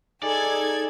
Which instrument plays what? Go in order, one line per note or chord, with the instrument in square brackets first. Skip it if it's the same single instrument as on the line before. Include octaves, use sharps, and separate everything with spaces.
[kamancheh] D#4 [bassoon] G#4 [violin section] A4 G#6 [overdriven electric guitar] D5